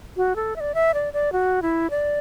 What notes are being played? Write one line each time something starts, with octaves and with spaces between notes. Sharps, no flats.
F#4
A4
E5
D5
E5
D5
D5
F#4
E4
D5